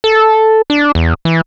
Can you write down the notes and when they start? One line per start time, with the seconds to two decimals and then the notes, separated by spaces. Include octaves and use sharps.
0.04 A4
0.70 D4
0.95 E2
1.25 E3